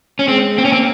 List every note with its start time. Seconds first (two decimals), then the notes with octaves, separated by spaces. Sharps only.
0.19 C#4
0.28 G#3 C4
0.57 A#3 C4
0.65 C#4
0.72 C4